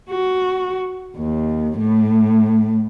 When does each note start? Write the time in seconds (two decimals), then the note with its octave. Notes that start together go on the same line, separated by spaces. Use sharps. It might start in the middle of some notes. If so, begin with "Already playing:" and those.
0.10 F#4
1.17 D#2
1.79 A2